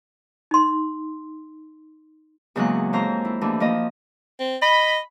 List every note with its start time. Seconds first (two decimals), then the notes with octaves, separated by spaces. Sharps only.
0.51 D#4 C6
2.56 E2 C#3 F#3 G#3 A#3 F#6
2.93 F2 G#2 C5 A#5
3.25 E4
3.41 D#2 E3 A3 D4
3.60 F3 A#3 D#5
4.40 C4
4.62 D#5 B5